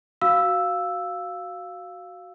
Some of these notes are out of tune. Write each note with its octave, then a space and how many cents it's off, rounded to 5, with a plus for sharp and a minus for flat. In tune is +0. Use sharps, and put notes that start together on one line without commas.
F#4 +5 F5 +0 E6 +0